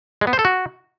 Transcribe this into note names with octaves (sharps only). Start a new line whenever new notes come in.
G#3
B3
C5
A4
F#4